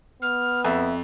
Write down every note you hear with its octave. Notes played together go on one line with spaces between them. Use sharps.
B3 F6
F2 E5